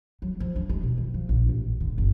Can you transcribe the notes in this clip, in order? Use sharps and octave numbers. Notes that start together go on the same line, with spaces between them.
F#3
F3
D4
G#3
B2
D#3
F3
A#1
A1
D3
G1